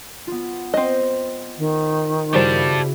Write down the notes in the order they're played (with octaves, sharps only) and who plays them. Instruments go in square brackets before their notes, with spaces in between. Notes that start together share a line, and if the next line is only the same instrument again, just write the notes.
[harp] B3 F4
[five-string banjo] C4 D#5 [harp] C5
[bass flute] D#3
[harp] C#3 E4 F#4 [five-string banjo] G3 C5 [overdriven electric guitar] G4 A5